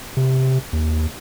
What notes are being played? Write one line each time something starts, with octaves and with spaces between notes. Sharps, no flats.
C3
D#2